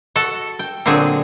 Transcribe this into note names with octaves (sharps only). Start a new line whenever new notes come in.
F#4 A4
G5
A#2 D3 F#3 C4 G#4